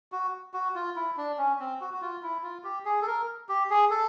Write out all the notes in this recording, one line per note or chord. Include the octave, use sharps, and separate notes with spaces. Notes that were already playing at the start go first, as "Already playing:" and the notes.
F#4
F#4
F4
E4
D4
C#4
C4
F#4
F#4
F4
E4
F4
G4
G#4
A4
A#4
G4
G#4
A4